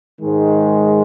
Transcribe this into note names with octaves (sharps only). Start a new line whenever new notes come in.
G#2 D#3 G#3